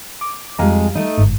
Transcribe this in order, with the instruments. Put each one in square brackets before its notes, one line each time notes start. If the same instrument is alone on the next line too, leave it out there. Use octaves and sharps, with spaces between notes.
[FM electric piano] D6
[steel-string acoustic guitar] F2 G#3 [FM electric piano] G3 F5 A#5
[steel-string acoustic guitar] A3 D#4
[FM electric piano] G1 G#2